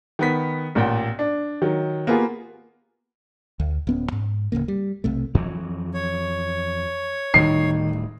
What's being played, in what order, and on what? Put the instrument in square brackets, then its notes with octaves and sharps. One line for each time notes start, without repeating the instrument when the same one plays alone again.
[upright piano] D#3 B3 B6
A1 A#2 F#5 G5
D4
D#3 F#3
A#3 B3 F4 G4 G#4
[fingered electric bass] D2
D1 B3 C#4
G#2
D1 G1 C#3 A#3
G3
B1 C3 A3
[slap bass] F2 E3 F#3
[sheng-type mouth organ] C#5
[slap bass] D1 A2 G3 [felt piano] D#3 [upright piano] C7